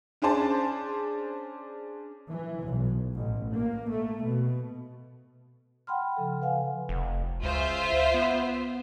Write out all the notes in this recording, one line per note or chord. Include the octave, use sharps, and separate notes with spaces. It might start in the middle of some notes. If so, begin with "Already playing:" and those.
C#4 D4 G#4 C5 A5
E3
B1
A1
A#3
A3
B2
F#5 G5 B5 C6 F6
C#3 F3 A4
B4 F5 F#5 G#5
F1
C#2 F4 C5 E5
B3